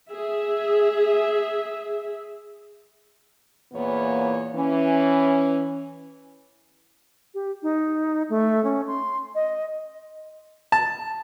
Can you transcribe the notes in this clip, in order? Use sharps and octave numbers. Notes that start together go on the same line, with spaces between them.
G#4 E5
E2 A#2 E3 A#3 B3 C#5
E3 C#4
G4
D#4
A3
C#4
C6
D#5
A5